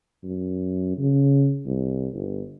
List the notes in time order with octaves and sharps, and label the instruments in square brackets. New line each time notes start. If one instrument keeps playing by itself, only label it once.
[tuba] F#2
C#3
C2
G1